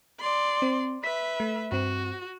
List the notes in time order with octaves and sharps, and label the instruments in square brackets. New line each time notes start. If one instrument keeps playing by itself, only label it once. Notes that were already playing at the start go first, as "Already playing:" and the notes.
[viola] D5 C6
[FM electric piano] C4
[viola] B4 E5 [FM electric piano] B6
[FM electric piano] A3
[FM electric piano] G2 C4 [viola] F#4